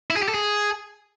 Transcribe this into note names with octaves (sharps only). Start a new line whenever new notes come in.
E4
G#4
G4
A4
G#4